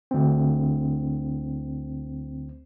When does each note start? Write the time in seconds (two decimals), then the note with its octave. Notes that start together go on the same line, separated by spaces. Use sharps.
0.11 D2 C4